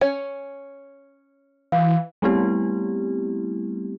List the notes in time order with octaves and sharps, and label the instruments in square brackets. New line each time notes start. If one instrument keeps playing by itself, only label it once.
[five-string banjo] C#4 C#5 G#5
[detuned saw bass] E3 [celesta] F5
[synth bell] G3 A3 B3 C4 E4 G4